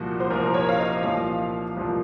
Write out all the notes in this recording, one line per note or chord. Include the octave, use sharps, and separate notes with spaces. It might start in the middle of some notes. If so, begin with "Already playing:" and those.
Already playing: C2 A#2 F3 F#4
C5
C2 A#2 F3 A#4
C#5
F5
D#5
C2 A#2 F3 F5
C2 A#2 F3